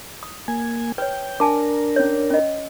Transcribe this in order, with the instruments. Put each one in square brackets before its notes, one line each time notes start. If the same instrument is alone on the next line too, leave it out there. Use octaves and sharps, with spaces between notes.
[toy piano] D#6
[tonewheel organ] A#3 G#5
[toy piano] B4 C#5 [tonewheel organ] G5
[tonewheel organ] D4 A#4 [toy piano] G#5 A5 D6
[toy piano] C#4 C#5
C#4 D#5